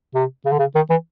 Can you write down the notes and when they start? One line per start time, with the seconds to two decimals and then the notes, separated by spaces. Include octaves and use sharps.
0.15 C3
0.45 C#3
0.52 D3
0.59 C#3
0.75 D#3
0.90 E3